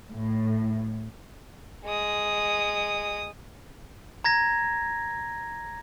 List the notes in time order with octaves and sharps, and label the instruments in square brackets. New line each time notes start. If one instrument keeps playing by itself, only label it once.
[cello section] A2
[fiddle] G#3 D#6
[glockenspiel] A#5 G#6 A#6